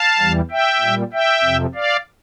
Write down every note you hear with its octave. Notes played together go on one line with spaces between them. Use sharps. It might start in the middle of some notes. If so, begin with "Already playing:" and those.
Already playing: F5 A5
E2 E3 G3
E5 G5
A#2 G3
E5 G5
F2 C3 F3
D5 F5